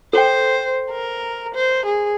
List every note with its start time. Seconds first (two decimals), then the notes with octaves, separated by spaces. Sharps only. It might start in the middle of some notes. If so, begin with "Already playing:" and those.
0.13 A4 C5 G5
0.90 A#4
1.55 C5
1.86 G#4